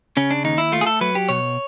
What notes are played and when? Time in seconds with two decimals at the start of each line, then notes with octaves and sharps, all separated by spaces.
0.17 C#3 C#4
0.31 D4
0.44 D#2 D#4
0.58 E4
0.72 A3 F4
0.81 G#4
0.87 A4
1.01 F#3 B4
1.15 G4
1.29 B2 C#5